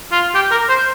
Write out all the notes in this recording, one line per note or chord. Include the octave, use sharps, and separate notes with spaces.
F4
G4
A#4
C5